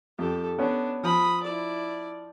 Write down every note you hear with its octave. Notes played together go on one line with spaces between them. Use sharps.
F2 G4 A4
B3 C#4 D4
F3 B5 D#6
E4 D5